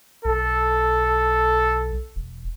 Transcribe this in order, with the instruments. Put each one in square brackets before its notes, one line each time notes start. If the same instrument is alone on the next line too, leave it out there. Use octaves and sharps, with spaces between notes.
[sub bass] B1 [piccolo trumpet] A4
[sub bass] E1